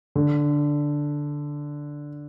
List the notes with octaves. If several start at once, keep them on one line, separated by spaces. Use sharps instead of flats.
D3